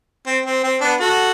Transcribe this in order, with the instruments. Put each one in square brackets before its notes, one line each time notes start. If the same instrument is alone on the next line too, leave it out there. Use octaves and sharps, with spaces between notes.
[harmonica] C4
C4
C4
B3 D4
F#4 A4